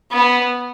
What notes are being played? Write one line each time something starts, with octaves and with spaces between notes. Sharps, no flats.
B3